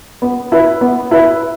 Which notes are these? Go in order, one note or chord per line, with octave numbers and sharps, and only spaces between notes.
B3
E4 B4
B3
E4 B4